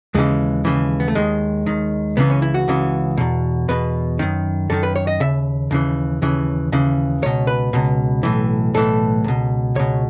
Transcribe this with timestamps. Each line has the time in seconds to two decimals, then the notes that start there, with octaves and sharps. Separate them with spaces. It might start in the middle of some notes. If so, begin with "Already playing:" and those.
0.15 D#2 C#3 E3 G#3
0.65 D#2 C#3 E3
1.00 B3
1.08 A3
1.15 D#2 D#3 G#3
1.66 D#2 D#3
2.17 C#2 C#3 E3 B3
2.30 C#4
2.42 E4
2.54 F#4
2.68 C#2 C#3 E3
3.18 E2 B2
3.69 E2 B2 B4
4.19 F#2 D#3
4.70 F#2 D#3 A4
4.83 B4
4.96 C#5
5.07 D#5
5.20 D#2 C#3 E5
5.71 D#2 C#3 E3
6.22 D#2 C#3 E3
6.72 D#2 C#3 E3
7.22 C#2 B2 C#5
7.47 B4
7.73 C#2 B2
8.23 B1 A2 E3
8.74 B1 A2 E3 A4
9.24 C#2 B2
9.75 C#2 B2 C#5